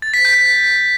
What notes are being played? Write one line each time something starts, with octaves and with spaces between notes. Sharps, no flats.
A6
B6
G6